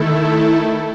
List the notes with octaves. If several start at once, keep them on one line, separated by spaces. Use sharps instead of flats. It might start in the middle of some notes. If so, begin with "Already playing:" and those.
Already playing: D#3 A3 E4 A4